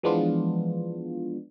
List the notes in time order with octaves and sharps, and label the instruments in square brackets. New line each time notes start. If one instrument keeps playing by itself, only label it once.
[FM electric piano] E3 F3 G#3 B3 D4 F4